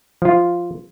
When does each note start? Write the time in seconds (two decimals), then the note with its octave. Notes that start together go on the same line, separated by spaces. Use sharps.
0.22 F3 F4